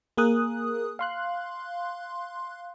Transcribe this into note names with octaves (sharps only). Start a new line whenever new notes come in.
A#3 G#4 A#4 D#6 F#6
F5 C6 F#6